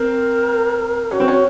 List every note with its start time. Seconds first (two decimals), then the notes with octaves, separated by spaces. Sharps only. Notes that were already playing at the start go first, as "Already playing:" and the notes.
Already playing: C4 A#4
1.11 C#4 F#4
1.20 C4
1.28 C#4